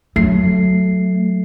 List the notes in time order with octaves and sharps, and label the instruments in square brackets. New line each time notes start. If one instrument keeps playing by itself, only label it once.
[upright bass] F#3 [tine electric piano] A3 C7